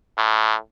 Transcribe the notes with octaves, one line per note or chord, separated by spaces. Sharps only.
A2